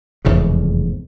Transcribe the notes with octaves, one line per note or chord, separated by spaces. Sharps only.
F1 E2 G#2 C#3